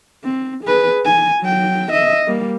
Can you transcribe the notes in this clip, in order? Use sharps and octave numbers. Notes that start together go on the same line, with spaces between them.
C4
G#4 B4
G#5
F#3 G5
D#5 E5
G3 A#3